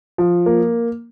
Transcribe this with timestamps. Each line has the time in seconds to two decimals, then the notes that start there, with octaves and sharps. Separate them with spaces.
0.18 F3
0.46 A#3